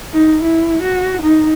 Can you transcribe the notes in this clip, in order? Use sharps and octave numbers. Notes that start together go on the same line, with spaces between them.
D#4
E4
F#4
D#4